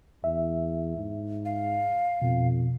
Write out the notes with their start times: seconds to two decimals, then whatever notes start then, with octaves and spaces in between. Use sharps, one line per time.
0.24 E2 E5
0.97 G#2
1.45 F5
2.22 F2 B2